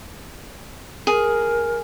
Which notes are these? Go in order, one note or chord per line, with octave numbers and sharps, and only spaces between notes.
G#4 A#4